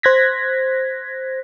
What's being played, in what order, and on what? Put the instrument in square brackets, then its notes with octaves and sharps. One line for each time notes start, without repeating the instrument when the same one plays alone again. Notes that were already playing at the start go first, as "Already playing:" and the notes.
[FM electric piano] C5 F#6 G#6 A#6 B6